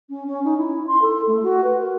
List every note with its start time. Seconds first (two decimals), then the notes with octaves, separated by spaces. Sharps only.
0.10 C#4
0.27 C#4
0.44 D#4
0.58 E4
0.87 C6
1.02 A4
1.27 A3
1.43 F#4
1.64 B4
1.80 A#4